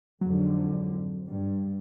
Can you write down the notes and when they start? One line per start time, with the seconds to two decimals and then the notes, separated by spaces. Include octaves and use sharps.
0.21 F2 G#2 D3 F#3
1.28 G2